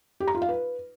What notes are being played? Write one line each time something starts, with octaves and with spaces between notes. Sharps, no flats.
G4
A#5
F4
F5
B4